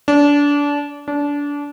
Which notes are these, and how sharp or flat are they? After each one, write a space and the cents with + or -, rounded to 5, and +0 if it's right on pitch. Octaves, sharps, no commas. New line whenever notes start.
D4 -25
D4 -25